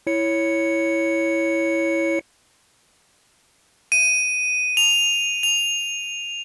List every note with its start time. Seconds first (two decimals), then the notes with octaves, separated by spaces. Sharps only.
0.07 E4 C#5 C#7
3.92 D#7
4.77 F7
5.43 F7